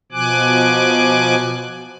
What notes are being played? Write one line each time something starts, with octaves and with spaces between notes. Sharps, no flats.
B2 F3 G#5 D6 F#6